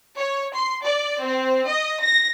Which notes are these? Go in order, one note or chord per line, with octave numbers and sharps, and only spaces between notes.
C#5
C6
D5
C4
D#5
A#6